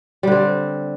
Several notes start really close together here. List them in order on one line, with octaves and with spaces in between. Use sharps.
G3 D3 C4